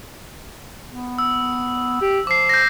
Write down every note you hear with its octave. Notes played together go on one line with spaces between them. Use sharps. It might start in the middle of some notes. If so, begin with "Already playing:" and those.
B3
E6
G4
F3 D6 C7
G6 A#6